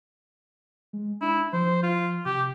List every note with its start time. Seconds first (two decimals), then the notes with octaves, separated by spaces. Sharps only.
0.93 G#3
1.21 D4 E4
1.53 F3 C5
1.83 F4
2.26 C3 G4